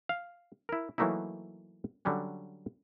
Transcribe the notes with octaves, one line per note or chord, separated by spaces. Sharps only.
F5
E4 A#4
E3 F#3 A3 A#3 D#4 E4
D3 F#3 G3 C#4 D4